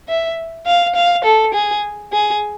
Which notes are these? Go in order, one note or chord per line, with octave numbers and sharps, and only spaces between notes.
E5
F5
F5
A4
G#4
G#4